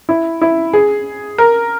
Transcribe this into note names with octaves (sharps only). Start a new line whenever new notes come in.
E4
E4
G#4
A#4